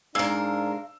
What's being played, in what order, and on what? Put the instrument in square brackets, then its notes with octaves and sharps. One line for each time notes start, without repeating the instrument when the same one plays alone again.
[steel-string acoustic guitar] G#2 A#4 [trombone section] D4 [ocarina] F5 [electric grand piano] E6 C7